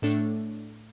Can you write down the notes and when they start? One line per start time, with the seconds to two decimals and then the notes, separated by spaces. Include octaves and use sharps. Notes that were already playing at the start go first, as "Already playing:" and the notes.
0.02 A2 A3 D4 A4